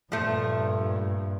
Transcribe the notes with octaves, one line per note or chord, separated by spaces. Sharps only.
G2 A#2 F3 A3